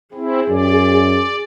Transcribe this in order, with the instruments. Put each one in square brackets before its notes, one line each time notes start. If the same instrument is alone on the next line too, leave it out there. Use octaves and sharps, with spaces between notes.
[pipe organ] C4 E4 [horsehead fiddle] G#4
[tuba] F#2 [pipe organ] D5